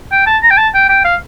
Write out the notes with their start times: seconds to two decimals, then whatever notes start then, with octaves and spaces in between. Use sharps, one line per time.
0.11 G5
0.27 A5
0.43 A#5
0.51 G5
0.58 A5
0.74 G5
0.89 G5
1.05 F5